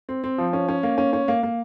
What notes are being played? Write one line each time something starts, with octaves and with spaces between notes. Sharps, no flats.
C4
C4
F3
C#4
C#4
A#3
C#4
C#4
A#3
A#3